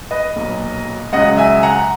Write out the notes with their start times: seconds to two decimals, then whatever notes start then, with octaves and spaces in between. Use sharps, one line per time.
0.11 B4 D#5
0.36 B1 A#2 F#3
1.12 C#2 C#3 F#3 D#5 F#5
1.37 E5 G#5
1.63 F#5 A#5